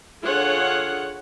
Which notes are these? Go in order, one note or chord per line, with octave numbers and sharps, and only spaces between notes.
D3 F4 G#4 C#5 F#5